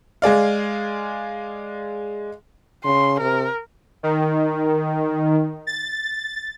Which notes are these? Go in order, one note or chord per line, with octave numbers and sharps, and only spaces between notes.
G#3 G#4 D5 F5
C#3 C6
C3 A#4
D#3
A6